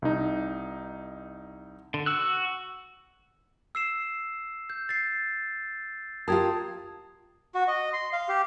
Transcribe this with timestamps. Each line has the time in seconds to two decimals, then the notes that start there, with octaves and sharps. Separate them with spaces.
0.02 C2 D#4
1.94 D3
2.06 F#4 E6 F#6
3.75 E6 C7 E7
4.70 G6
4.89 A6 C7
6.28 F4 G4 A#4 A5 D#6 G#6
7.55 F#4
7.68 D#5
7.93 C6
8.13 F5
8.29 G4